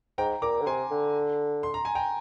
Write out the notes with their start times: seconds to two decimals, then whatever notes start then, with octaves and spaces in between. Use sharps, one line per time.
0.18 G#2 G5 A#5
0.42 A#2 A#5 D6
0.61 D3
0.66 C3 G#5 C6
0.91 D3
1.63 C6
1.74 A#5
1.85 G#5
1.95 G5 A#5